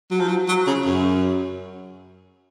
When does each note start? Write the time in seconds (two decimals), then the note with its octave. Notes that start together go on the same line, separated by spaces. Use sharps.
0.11 F#3
0.20 F3
0.28 F#3
0.48 F#3
0.67 C#3
0.85 F#2